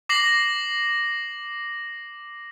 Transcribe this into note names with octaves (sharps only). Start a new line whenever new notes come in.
D6 A#6 C7 F#7